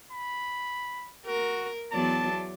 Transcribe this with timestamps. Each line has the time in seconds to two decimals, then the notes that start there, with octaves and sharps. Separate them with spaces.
0.12 B5
1.26 F#4 A#4
1.92 E2 F#3 D5 A5